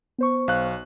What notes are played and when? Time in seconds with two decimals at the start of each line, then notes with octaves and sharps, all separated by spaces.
0.18 B3 C5 C#6
0.48 B1 F5 F#6